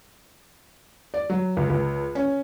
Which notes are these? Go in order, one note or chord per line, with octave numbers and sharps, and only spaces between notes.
D5
F#3
C#2
C#2
C#4